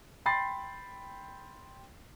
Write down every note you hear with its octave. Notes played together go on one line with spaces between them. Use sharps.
G5 B5 C6 A6 C7